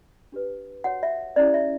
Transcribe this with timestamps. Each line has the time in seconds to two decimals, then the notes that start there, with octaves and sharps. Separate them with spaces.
0.32 D4 G4 B4
0.84 F#4 C#5 F#5
1.03 E5
1.36 C#4 E4 G4 C#5 D5
1.54 E5